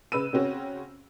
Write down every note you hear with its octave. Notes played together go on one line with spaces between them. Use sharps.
C#3 B4 E6 D#7
C#3 C4 C#4 F#4